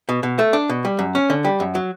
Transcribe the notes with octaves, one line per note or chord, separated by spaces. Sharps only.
B2
B2
A3
D4
B2
G3
F#2
C#4
D3
G3
F#2
F#3